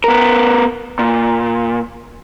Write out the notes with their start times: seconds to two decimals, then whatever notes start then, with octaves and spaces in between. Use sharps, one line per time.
0.04 B3 A#4
0.99 A#2